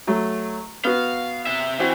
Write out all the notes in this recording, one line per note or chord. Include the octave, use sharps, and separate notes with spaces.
F#3 A3
B3 F#4 F5
C3 E5
E3 C4 F#4